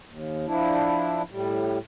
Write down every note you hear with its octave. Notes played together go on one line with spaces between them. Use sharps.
D#2
F3 D4 E4
A2 G3